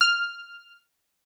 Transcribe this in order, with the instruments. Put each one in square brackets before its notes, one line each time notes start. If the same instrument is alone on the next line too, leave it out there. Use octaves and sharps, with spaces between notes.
[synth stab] F6